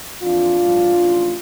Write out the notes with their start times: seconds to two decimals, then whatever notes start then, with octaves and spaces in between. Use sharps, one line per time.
0.22 F2 E3 D4 F4
0.59 A1 G2 F3
0.96 A1 A2 F3